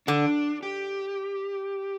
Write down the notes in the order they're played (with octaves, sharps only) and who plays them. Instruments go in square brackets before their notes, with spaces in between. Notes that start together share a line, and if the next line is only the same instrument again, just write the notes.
[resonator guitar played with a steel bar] D3 [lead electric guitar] D4
[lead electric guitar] G4